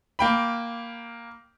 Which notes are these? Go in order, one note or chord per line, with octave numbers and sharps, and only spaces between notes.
A#3 G5 B5